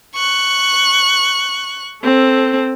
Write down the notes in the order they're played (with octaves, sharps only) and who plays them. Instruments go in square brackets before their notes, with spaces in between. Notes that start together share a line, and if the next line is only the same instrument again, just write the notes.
[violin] C#6 F#6
[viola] C4 A4